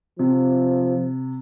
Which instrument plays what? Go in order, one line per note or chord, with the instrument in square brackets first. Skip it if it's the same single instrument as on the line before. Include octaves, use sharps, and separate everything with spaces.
[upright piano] C3 [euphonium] F3